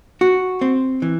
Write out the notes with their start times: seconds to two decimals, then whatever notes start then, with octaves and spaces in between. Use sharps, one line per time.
0.21 F#4
0.61 C4
1.02 E3